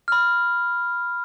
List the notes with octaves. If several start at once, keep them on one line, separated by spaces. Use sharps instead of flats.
B5 F6